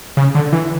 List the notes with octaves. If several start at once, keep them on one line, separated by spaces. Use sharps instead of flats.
C#3
D3
E3